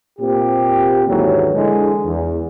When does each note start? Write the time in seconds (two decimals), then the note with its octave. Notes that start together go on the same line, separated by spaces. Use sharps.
0.19 A#2 C4 G4
1.07 D#2 G#2 D3 E3 F#3
1.54 D3 E3 G#3
2.05 E2